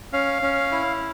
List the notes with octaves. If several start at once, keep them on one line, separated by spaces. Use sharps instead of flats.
C#4 F5
C#4
E4